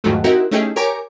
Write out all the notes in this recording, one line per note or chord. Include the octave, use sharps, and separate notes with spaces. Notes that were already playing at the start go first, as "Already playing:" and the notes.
E2 G#2 D#3 F3 F#3 A3
C4 D#4 E4 F#4 G4 A#4
A3 C#4 D#4 E4 G4 G#4
G4 A#4 C#5 G#5 A#5 D6